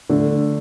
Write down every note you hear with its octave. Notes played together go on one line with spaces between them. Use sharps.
D3 A3